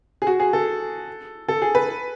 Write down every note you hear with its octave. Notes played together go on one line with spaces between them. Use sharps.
G#4
F#4
G#4
A4
A4
G#4
B4